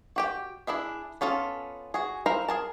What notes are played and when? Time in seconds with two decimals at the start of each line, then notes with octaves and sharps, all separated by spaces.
0.16 F#4 G4 G5
0.67 D4 E4 G#4 E5
1.21 B3 C#4 F4 A4
1.94 F#4 G#4
2.26 E4 A#4 C5 F5 A#5
2.49 G#4 A#4 A5